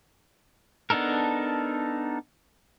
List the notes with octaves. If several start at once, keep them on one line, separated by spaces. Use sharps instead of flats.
B3 D4 D#4 A4 A#4